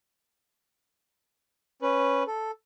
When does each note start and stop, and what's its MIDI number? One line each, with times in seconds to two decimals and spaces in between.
1.82 2.23 61
1.82 2.23 71
2.27 2.51 69